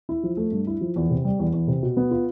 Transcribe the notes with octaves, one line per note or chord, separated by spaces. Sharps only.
E4
F3
A3
G2
E4
F3
E2
C3
G3
E2
E2
C3
B2
B3
F4